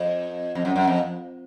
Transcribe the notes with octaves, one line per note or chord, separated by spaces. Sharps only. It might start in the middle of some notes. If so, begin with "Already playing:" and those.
Already playing: F2
F2
F#2
F#2
F2